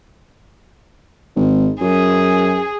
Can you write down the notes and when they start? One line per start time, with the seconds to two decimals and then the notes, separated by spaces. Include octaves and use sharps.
1.36 G#1
1.81 F#2 G#4